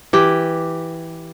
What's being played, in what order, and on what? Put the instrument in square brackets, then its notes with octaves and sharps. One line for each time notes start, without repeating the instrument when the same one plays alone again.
[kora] E3 G4